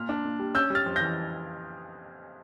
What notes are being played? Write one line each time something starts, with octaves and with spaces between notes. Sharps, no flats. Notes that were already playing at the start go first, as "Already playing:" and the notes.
Already playing: A#2 F6
D4
A#2
G3
C#4 E6 G6
G3 F6 A6
F2
E3 G6 A#6